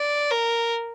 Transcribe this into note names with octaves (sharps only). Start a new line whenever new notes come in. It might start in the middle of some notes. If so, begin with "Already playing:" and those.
Already playing: D5
A#4